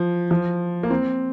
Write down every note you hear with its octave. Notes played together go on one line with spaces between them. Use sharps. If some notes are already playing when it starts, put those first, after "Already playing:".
Already playing: F3
F3
A#3
C4